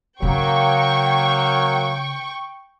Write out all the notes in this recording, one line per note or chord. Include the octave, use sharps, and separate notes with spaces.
C#3 F#3 A#3 G5 C#6